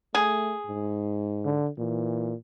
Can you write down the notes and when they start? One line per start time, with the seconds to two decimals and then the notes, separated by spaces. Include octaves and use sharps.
0.15 A3 G#4
0.67 G#2
1.45 D3
1.78 A#2 E3